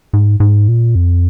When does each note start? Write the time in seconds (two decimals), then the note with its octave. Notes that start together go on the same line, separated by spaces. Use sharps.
0.13 G#2
0.40 G#2
0.68 A#2
0.95 F2